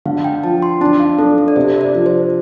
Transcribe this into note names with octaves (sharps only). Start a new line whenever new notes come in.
D3 F5
G5
F3 A5
C6
D4 A5
F5
D4 A4
A4
D5
C3 C5
D5
F3
C5